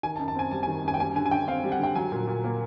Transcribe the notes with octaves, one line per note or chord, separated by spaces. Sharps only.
D#3 G#5
A5
F#2
A5
C4 G#5
G3 A5
G#5
D#3
F#2 G#5
G5
G3 G#5
D3 G#5
G#5
D3 G5
C4 F5
G3
F#5
D3 G5
F#3 G#5
A#2
A#2
A#3